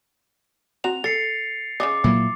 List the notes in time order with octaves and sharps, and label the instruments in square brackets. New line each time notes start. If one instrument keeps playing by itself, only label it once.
[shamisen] C4 F#4 A#5 [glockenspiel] F7
[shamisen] A4 [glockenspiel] A6 C7 C#7
[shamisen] C#3 C#4 D#5 [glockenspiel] D6
[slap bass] A#2 F#3 A#3 [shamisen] E4